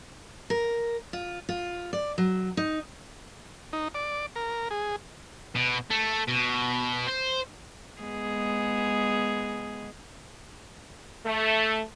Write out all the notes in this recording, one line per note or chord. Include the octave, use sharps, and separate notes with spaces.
A#4
F4
F4
D5
F#3
D#4
D#4
D5
A#4
G#4
B2
A3
B2
C5
G#3 B3 G#4
A3